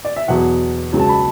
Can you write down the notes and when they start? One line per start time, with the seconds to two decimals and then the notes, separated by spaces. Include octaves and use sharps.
0.05 D5
0.16 E5
0.28 E2 B2 F#3 F#5
0.93 C#2 C#3 F#3
1.00 A5
1.09 B5